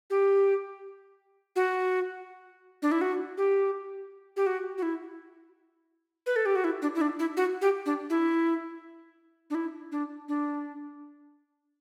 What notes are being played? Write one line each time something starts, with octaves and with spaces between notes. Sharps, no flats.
G4
F#4
D4
E4
F#4
G4
G4
F#4
F#4
E4
B4
A4
G4
F#4
E4
D4
E4
D4
E4
F#4
G4
D4
E4
D4
E4
D4
D4